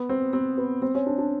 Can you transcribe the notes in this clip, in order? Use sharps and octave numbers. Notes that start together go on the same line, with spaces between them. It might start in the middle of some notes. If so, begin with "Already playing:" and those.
Already playing: B3
C4
C4
B3
C4
C#4
D4
D4